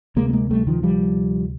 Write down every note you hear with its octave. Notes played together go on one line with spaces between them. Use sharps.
D2 C3 G#3 A#3
B3
G#3 A#3
G3 A3
D#3 F3
F3 G3